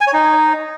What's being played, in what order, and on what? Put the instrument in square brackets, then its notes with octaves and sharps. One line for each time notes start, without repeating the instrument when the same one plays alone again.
[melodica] G#5
C#5
D#4